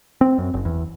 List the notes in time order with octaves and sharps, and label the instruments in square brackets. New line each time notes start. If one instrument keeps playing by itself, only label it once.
[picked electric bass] C4
F#2
F#1
E2